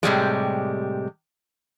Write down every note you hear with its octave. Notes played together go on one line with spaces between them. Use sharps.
A2 C3 G3 G#3